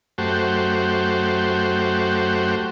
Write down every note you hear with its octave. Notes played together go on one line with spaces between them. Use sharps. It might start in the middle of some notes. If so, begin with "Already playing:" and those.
F#2 A3 F#4 G4 C5